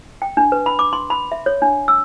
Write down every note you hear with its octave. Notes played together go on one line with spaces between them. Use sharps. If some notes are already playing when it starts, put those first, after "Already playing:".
G5
D4
B4
B5
D6
C6
B5
E5
C#5
D4
E6